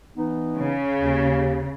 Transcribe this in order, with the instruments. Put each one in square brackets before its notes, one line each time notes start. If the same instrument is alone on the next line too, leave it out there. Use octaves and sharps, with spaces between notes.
[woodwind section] E3 B3 D#4
[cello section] C#3
[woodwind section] D#2